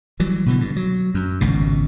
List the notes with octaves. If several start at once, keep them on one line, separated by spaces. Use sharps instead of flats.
E3 F#3 G3
B2 D3 E3
G2
F#3
F#2
G#1 C#2 B2